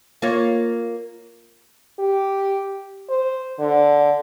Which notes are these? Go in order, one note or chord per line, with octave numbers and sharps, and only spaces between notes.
A#3 F4 C#5
G4
C5
D3